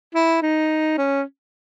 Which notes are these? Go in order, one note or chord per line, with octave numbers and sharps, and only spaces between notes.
E4
D#4
C#4